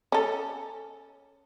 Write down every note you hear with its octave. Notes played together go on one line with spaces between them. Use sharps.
C#4 A4